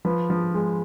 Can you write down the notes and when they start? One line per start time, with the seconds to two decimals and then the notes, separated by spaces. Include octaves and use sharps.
0.05 F3 B4
0.30 F3
0.54 G#3